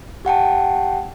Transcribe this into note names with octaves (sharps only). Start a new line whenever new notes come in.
G4 F#5 G5 A5